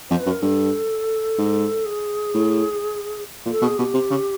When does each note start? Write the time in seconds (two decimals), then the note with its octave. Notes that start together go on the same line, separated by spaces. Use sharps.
0.10 F2 C5
0.20 B4
0.26 F#2
0.31 A#4
0.42 G2 A4
1.38 G#2
1.86 G#4
2.34 A2
3.46 A#2
3.51 A4
3.62 B2
3.64 G#4
3.78 B2 G4
3.94 C3
4.11 C#3